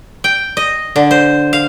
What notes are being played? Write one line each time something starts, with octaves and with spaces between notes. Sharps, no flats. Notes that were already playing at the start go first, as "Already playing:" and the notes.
G5
D#5
D3
C5
F5